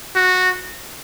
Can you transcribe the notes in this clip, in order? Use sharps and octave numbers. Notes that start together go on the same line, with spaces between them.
F#4